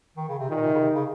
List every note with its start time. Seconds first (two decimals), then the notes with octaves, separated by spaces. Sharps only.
0.17 D#3
0.29 C#3
0.39 C3
0.49 A#2 D#3
0.65 C3
0.74 C#3
0.79 C3
0.94 C#3